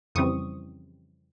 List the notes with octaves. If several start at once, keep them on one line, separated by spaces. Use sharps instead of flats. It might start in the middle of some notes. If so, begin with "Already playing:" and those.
F2 C#3 E3 G3 C4 C#6 D#6